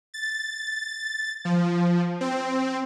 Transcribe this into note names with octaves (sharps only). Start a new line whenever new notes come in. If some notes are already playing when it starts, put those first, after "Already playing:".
A6
F3
C4